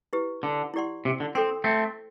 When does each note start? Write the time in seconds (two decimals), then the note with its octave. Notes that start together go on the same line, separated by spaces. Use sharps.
0.13 E4 G4 B4
0.43 D3
0.74 E4 G4 D5 F#5 C6
1.05 C3
1.20 D3
1.35 C4 A4 C5 G5 C6
1.64 A3 C4